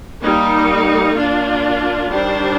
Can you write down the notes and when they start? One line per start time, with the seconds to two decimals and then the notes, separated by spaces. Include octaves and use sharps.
0.22 G3 A#3 D#4
1.15 A#3 D4 F4
2.09 D#3 G3 D4 G4 C5